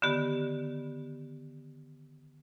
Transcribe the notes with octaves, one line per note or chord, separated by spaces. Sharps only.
D3 D#3 B3 G4